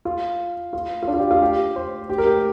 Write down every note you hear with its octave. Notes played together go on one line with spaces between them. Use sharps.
F4
F4
F4
D4
F4
G4
F4
G4
C5
G4
A#4
G4